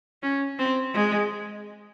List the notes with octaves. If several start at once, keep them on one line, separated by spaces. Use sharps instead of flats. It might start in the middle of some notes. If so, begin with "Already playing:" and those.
C#4
C4
G#3